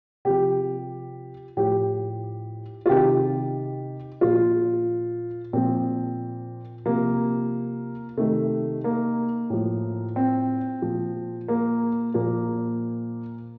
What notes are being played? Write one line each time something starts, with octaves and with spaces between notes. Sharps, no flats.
C3 F3 G4
A2 F3 G4
F4
C3 D#3 G4
A#2 F3 F4
A#2 F3 C4
C3 F3 A#3
C3 D#3 A3
A#3
A2 F3
C4
A#2 F3
A#3
A#2 F3 A#3